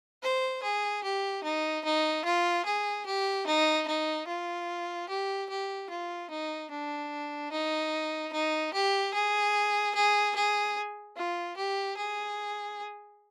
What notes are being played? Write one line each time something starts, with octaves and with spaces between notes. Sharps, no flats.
C5
G#4
G4
D#4
D#4
F4
G#4
G4
D#4
D#4
F4
G4
G4
F4
D#4
D4
D#4
D#4
G4
G#4
G#4
G#4
F4
G4
G#4